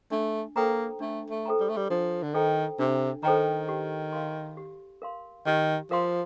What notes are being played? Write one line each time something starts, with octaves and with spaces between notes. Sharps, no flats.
A3 D4
A#3 A4 C5 G5 A#5
A3 D4
A3
A4 C5 G5 A#5
G3
A3
G3
F3 D4
D3
D#3 A4 C5 G5 A#5
C3 D4
D#3 A4 C5 G5 A#5
G4
A#4 F5 C6
G4
A#4 F5 C6
D#3 G4
F3 A#4 F5 C6